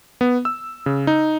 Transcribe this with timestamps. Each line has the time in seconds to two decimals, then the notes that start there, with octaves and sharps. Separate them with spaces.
0.21 B3
0.45 E6
0.86 C#3
1.07 D#4